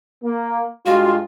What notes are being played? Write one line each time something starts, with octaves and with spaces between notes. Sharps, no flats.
A#3
G2 G#3 F4 F#4